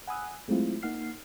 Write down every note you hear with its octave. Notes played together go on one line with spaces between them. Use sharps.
F#5 G#5 B5 D#6 E6 F#6
F#3 G#3 A3 C4 E4 F4
A#3 D#4 F#5 F6 C7